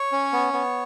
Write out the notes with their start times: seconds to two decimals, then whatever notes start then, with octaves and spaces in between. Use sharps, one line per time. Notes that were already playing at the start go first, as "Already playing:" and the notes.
Already playing: C#5
0.12 C#4
0.33 B3
0.53 B3